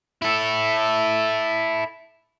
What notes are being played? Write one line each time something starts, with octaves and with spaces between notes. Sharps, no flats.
E4 A4